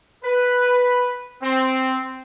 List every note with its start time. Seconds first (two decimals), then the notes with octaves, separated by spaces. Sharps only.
0.24 B4
1.42 C4